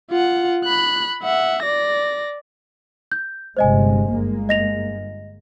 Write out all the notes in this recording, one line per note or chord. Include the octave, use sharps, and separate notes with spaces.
F4 F#5
B5 F#6
E5 F#5
D5 A#6
G6
G1 C3 G#3 C5 D#5 G#5
G1 G#3 A#3
D#5 A#6 F7